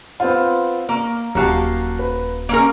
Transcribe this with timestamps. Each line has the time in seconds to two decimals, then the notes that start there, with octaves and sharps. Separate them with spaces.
0.20 B3 C4 F4
0.89 A#3 C#6
1.35 D#1 F#3 A#3 F#4 G4 F5 A5
1.99 B4
2.49 A#3 C#4 A#4 D7